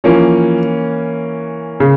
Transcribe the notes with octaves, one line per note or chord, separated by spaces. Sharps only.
E3 F3 A#3 C#4
C#3